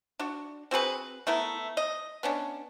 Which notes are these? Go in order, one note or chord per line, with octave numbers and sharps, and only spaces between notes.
D4 F#4
C4 F#4 G#4 B4
A3 B3 E4 A#4
D#5
B3 C#4 D4